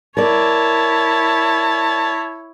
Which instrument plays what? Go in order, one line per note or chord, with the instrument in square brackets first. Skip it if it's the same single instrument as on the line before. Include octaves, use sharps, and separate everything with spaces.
[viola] E4 C#5 [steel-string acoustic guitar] A#4 D5 [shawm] A5